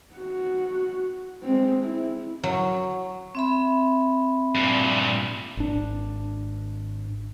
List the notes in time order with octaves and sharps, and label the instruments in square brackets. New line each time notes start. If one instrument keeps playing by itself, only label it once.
[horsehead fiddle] F#4
G#3 C4
E4
[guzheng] F#3
[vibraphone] C4 E5 B5
[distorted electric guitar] G2 A#2
[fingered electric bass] G#1 D4